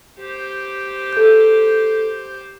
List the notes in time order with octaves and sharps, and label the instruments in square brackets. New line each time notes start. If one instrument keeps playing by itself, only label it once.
[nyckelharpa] G4 C5
[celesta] A4 G6